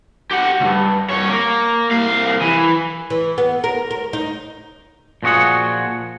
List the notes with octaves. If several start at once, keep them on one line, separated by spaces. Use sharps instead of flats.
G4 F#5
D2 G2
G2 C#5
A#3
C2 F5
E3
E3
B3
A#4
A#4
D#4
A#2 F3 F#4 G#4 F#5